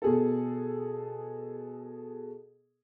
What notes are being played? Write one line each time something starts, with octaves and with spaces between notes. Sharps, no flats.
B2 G#4 A4